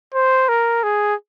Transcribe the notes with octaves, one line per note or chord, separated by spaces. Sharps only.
C5
A#4
G#4